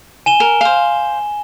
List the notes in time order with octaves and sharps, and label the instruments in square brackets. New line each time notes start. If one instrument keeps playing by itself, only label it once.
[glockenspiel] G#5 E7 G7
[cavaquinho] A#4
C5 F5